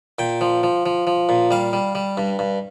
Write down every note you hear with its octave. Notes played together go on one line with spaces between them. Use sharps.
A#2 G5
F3
F3
F3
F3
A#2
G3 F5
G3
G3
G2
G2